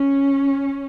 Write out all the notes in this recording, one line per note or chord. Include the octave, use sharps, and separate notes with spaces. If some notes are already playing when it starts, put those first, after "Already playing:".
Already playing: C#4